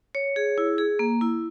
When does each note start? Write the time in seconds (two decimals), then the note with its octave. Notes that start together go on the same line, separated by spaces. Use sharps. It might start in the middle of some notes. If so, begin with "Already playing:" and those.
0.15 C#5
0.36 G#4
0.58 E4
0.78 G#4
0.99 A#3
1.21 E4